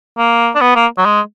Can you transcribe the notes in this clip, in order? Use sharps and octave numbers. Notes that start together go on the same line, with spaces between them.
A#3
D4
B3
A#3
F#3
G#3